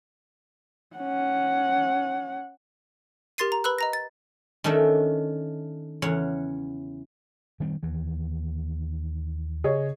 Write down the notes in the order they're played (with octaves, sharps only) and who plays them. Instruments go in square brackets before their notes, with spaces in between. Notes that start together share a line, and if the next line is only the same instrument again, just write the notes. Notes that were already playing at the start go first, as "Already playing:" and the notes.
[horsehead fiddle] C#4 F#5
[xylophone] G4 A#4 C6 A6 C7 D#7
A#5
B4 B5 E6 F#6
D#5 A#5 A#6
A6
[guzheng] D#3 A3 C#4 D4 E5
E2 C#3 C#5 F#5
[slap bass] D#3 G3 C4
D#2 E3
[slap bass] C#3 [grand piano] G#4 C#5 D#5